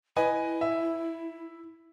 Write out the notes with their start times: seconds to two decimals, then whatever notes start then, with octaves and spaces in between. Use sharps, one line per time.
0.16 E4 B4 D#5 G#5
0.61 E5